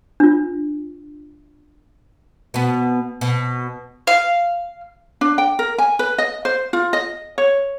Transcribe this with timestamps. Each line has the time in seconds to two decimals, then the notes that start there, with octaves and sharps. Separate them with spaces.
0.20 D4 F4
2.54 B2 B3
3.21 B2
4.07 F5
5.21 D4
5.38 G5
5.59 A#4
5.78 G#5
5.99 B4
6.18 D#5
6.45 C5
6.73 F4
6.93 D#5
7.38 C#5